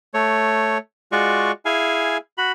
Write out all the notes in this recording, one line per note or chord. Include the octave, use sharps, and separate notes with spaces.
A3 C#5
G#3 F4 F#4 D5 C#6
E4 G#4 F5 G#5
F#4 B5